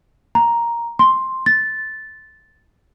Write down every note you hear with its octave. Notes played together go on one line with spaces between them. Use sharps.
A#5
C6
A6